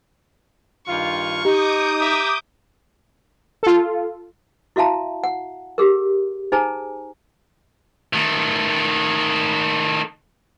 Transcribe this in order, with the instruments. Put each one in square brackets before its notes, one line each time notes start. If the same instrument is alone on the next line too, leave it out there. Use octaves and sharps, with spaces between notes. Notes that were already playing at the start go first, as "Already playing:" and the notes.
[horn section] G2 D#3 F4 [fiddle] C#6
[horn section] D#4 [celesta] G4 [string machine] D6 D#6 G6
[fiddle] E5 A#5
[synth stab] F4 A4
[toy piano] E4 F#4 E5 F5 A5 A#5
F#5
G4 G#4 A#4
D#4 G#4 C5 G#5 A#5
[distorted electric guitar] D#3 A3